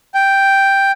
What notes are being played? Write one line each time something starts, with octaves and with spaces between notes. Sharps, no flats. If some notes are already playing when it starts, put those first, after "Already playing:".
G5